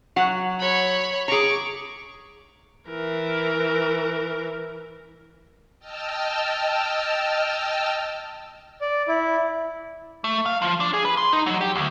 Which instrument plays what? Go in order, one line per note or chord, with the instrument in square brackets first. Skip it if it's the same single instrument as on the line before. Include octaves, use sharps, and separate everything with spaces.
[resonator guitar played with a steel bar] F#3 F#5
[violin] C#5 B5
[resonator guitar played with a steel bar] G#4 A#5 [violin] C#6 D6
[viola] E3 A#4
[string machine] D#5 G5 A5 E6 F6
[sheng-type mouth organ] D5
E4
[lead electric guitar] A3
F5
F3
D4
G#4
B4
C6
D#4
F#3
G4
D2